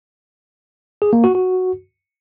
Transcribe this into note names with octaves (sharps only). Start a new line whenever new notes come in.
G#4
A#3
F#4
F#4